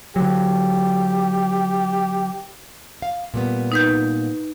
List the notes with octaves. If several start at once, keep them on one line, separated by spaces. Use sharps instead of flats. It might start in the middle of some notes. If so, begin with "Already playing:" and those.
D3 F#3 G4
F5
A#2 G3 B3
D#4 B4 G6